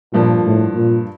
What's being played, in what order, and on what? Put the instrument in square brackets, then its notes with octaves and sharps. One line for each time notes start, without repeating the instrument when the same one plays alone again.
[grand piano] G2 F3 A#3 [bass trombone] A#2
[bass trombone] A2
A#2